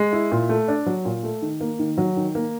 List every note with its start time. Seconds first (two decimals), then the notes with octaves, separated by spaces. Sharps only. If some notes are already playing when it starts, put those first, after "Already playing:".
Already playing: G#3
0.13 E4
0.32 A#2
0.49 A3
0.68 D4
0.86 F#3
1.05 A#2
1.23 A3
1.42 D#3
1.60 A#3
1.79 D#3
1.98 F#3
2.17 D#3
2.35 A#3